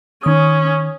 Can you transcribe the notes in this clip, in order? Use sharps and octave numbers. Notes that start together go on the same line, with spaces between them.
D#3 C#4 D#6